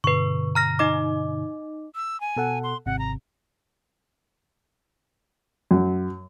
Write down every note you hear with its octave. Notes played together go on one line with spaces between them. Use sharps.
G2 B2 D3 B4 C#6
A#5 F6 A#6
D#4 D#5 D6
E6
G#5
B2 A4 F#5
C6
G#1 C3 F#5
A#5
F#2